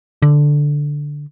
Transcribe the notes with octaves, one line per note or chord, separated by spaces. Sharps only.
D3